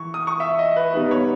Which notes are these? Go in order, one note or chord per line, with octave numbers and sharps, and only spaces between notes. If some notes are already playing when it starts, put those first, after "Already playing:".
Already playing: E3 C#6
D#6
C#6
E5
D#5
B4
B2 G3 B3 D#4 B4
C#5